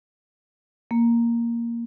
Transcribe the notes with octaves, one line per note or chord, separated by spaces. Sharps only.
A#3